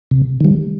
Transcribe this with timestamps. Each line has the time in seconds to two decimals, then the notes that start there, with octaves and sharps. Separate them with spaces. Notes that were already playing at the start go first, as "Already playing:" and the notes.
0.11 C3
0.41 D#3 G3